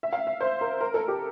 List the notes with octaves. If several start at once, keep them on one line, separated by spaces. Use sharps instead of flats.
E5
F5
E5
C5
A#4
A#4
A4
G4